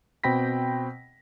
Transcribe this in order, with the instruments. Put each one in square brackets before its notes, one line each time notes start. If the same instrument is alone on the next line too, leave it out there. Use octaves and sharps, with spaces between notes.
[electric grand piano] B2 C4 G5 B5 A#6 B6